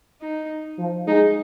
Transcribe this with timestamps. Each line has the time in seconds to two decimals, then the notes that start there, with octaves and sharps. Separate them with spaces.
0.22 D#4
0.78 F3
1.07 G#3 D#4